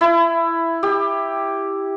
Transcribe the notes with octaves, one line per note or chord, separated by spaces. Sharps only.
E4
G4